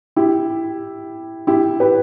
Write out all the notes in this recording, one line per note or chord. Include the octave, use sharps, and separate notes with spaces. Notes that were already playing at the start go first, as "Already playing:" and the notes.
E4 G4
E4 G4
G4 B4